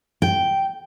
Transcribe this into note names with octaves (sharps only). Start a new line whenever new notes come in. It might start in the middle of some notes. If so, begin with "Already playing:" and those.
G5